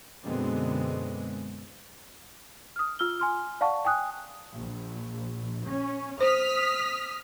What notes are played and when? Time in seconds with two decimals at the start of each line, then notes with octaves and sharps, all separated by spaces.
0.24 F#2 B2 D3 G#3 B3 C4
2.76 D#6 F6
2.99 F4 E6 F6 G7
3.20 G#5 C6 F6
3.61 D5 F5 F#5 A5 C#6
3.85 G5 G#5 D#6 F#6
4.55 A#1
5.67 C#4
6.21 C5 D#6 F6 B6